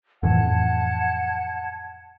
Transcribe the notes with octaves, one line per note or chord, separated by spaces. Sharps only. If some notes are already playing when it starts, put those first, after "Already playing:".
F2 A2 E3 F#5 A5 G#6